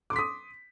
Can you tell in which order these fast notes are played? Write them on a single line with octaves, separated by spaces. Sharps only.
D6 C6 B6 D#6